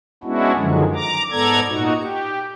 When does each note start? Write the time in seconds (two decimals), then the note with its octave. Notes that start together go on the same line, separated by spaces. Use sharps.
0.24 G#3 B3 C#4 D4 E4 F#4
0.58 F#2 D3 D#3 F3 F#3 G#3
0.94 A#5 D6
1.31 G#2 B3 A4 D5 A#5 G#6
1.68 A#2 D#4 F#4
1.99 G4